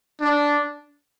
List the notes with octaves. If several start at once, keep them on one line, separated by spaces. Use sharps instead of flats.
D4